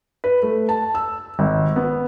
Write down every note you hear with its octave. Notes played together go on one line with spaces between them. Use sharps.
B4
A3
A5
E6
G#1
B3